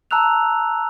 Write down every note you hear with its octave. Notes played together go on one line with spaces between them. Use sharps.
A5 A#5 E6 F#6 F7